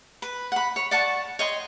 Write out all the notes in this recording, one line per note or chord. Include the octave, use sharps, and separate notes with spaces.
B4
F#5 B5
C#5
D5 F#5 A5 C#6
C#5 D#5 G5 C6